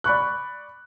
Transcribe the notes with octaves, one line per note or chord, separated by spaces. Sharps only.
D5 B5 C#6 F#6